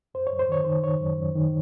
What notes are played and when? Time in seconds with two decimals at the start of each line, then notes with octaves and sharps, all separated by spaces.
0.14 F#2 C5
0.27 C#5
0.32 F#2
0.39 C5
0.49 D#3 C#5
0.64 D#3 C5
0.84 D#3 C#5
1.01 F#2
1.18 F#2
1.36 D#3